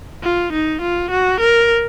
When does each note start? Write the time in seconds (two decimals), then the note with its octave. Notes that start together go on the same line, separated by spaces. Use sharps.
0.23 F4
0.53 D#4
0.82 F4
1.11 F#4
1.40 A#4